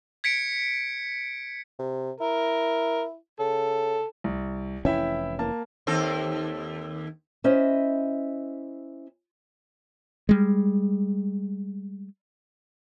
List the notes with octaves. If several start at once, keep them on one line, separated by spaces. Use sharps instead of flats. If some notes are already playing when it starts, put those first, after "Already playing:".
G#6 B6 C#7 D7
C3
E4 A#4
C#3 A4
C2
F1 E3 C#4 E4 E5 G5
A#3 A5
D#2 C4 A4
C#4 E4 C5 D#5 E5
G3 G#3